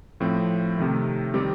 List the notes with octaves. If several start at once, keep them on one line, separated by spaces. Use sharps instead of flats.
A2 F3 C4
C3 D#3 A3
D#3 G3 C4 G4